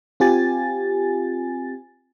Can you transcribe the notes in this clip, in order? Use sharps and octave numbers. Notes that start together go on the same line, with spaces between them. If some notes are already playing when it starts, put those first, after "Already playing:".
C4 F4 G4 G#5 A6